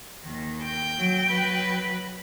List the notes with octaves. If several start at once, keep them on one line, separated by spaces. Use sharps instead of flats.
D#2 D#3
G5
F#3
F#3 B4